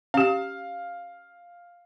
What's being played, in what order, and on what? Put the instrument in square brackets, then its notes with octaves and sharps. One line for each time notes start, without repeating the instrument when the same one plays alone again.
[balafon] C#4 G4 [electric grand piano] F5